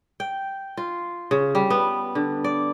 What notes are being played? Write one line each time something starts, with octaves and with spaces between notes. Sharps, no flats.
G5
F4
C#3
G3
B3
D3
D5